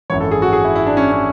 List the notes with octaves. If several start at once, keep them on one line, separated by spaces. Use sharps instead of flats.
G#1 F#2 E3 C#5
A4
G#4
F#4
G#4
E4
E4
D4
C#4
C#4